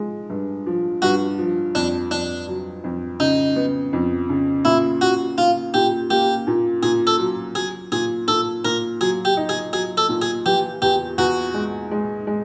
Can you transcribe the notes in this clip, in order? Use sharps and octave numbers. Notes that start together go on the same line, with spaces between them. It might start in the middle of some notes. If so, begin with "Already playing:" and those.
Already playing: F3 G#3
G2
F3
G2 F#4
F3
F2 D4
F2 D4
F#3
F2
C#3 D#4
B3
F2
C#3
A#2 E4
A#2 F#4
A#2 F4
A#2 G4
A#3 G4
A#2
A#2 G#4
A4
F#3
F#3 G#4
A#2 G#4
A#2 A4
A#2 A#4
F#3 G#4
G4
D#4
G#4
F#3 G#4
A4
A#2
G#4
E3 G4
E2 G4
E2 F#4
G#3
G#3
G#3